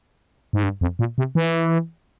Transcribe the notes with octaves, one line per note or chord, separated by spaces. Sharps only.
G#2
G2
F2
A#2
C3
E3